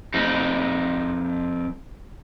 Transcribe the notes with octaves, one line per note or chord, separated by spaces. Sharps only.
F2 D#4